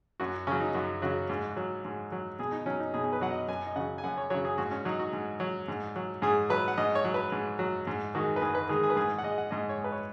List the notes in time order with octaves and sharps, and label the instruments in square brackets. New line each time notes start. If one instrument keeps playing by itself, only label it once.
[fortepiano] F#2 F#4
C#3 F#3 C#4
D#4
F#2 F#4
C#3 F#3 F#4
G#2
F#3
G#2
F#3
B2 G#4
D#4
F#3 C#4
D#4
B2 G#4
G#4
B4
F#3 F#5
D#5
F#2 G#5
D#5
C#3 F#3 F#5
G#5
F#2 F#5
C#5
C#3 F#3 C#5
G#4
G#2 F#4
C#4
F#3 D#4
F#4
G#2
F#3
G#2
F#3
G#2 G#4
F#3 B4
F#5
G#2 D#5
C#5
F#3
B4
G#2
F#3
G#2
D#3 G#3 F#4
B4
G#2 G#4
B4
D#3 G#3 G#4
G#4
B4
G#2 G#4
F#5
G#3 D#5
F#5
G#2 D#5
C#5
G#3
B4
C#5